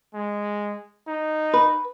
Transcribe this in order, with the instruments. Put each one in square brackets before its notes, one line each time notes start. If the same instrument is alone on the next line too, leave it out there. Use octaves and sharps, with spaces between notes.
[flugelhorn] G#3
D#4
[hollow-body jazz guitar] B4